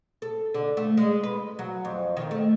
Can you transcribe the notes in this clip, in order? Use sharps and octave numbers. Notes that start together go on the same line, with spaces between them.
A4
D3
A3
G#3
B4
F#3
F2
D#3
A3